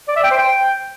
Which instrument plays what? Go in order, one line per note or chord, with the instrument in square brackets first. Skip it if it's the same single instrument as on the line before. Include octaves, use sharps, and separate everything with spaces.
[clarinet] D5
E5
G5
C5
G5